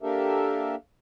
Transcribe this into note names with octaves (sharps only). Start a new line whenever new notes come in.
A#3 D4 G4 A4 A#4 E5